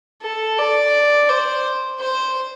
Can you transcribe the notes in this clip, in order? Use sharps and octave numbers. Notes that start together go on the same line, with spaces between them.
A4
D5
C5
C5